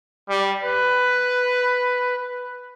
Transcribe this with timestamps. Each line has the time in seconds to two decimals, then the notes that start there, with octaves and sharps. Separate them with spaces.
0.30 G3
0.64 B4